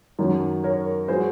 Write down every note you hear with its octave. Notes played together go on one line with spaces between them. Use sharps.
F#2 D#3 F#3
A#4 C#5
F#3 G#4 C5